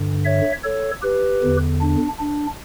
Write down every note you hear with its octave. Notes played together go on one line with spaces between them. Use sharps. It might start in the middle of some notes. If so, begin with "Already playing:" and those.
Already playing: G2 D3
C#5 E5
A4 C#5
G4 B4
E2 D3
D4
D4